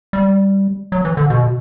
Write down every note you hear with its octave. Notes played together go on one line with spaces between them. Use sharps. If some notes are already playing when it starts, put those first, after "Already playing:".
G3
F#3
E3
D3
B2